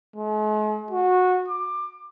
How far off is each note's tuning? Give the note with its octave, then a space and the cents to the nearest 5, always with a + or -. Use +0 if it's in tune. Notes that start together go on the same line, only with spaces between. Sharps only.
G#3 +45
F#4 -20
D6 +20